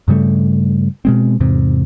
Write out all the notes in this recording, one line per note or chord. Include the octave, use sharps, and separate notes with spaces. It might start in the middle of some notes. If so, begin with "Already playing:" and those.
G2 C#3 G3 A3
B2 G#3 C4
E2 G#2 C3